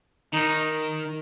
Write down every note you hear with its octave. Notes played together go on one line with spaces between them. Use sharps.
D#3 D#4